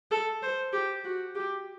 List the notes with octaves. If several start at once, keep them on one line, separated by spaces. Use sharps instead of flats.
A4
C5
G4
F#4
G4